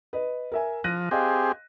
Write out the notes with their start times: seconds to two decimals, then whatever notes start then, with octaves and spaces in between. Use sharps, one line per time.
0.13 B4 D#5
0.52 A#4 E5 G#5
0.84 F3 F#6 A#6 D#7
1.11 C4 G4 G#4 D#5 F5